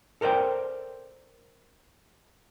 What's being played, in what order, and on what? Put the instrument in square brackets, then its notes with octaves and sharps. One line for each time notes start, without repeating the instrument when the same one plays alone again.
[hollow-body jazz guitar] A4 A#4 C5 D5 G5